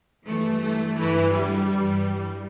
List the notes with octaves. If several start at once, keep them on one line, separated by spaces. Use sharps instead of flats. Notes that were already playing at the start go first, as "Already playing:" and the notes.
G2 E3 A3
A3
G2 D3 E3
G3
G2 E3